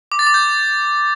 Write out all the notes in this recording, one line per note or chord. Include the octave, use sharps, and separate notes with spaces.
D6
A6
D6
G6